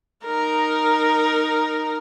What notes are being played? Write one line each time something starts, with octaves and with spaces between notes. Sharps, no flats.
D#4 A#4